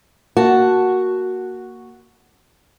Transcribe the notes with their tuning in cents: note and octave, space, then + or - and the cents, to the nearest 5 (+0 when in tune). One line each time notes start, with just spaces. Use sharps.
A#3 +0 F#4 +0 A5 +0